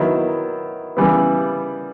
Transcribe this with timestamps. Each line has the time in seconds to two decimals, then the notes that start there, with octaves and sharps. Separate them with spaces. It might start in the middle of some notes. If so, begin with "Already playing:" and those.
Already playing: D#3 F#3 B3 E4
0.97 C#3 E3 G3 B3